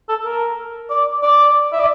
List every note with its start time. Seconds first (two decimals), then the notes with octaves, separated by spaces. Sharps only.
0.09 A4
0.25 A#4
0.90 D5
1.22 D5
1.72 E5
1.79 D5